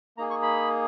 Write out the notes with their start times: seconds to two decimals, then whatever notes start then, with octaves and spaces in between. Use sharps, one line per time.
0.17 A#3 D#4 G#4 A#5
0.30 C#6
0.43 B5